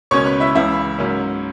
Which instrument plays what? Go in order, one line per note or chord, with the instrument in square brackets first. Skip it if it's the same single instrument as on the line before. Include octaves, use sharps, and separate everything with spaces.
[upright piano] C#2 B2 A#3 C#4 C#5 C#6
B4 B5
E4 E5
C#2 C#3 E3 E4 E5
G#2 F#3 A#3 C#4